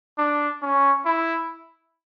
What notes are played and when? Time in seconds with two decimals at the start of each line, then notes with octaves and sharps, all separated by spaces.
0.18 D4
0.62 C#4
1.05 E4